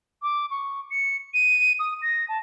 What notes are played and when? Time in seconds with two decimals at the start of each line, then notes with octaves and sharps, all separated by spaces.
0.22 D6
0.51 C#6
0.90 C#7
1.34 D#7
1.79 D#6
2.02 A#6
2.28 A5